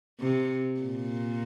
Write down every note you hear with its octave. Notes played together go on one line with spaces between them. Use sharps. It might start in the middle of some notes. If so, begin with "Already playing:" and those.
C3
A#2